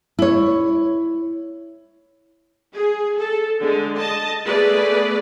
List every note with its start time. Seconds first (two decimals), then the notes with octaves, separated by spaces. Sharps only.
0.19 E4 C#5
2.74 G#4
3.18 A4
3.61 D3 G#3
3.99 D#5 A5
4.46 A3 B3 G#4 B4 D5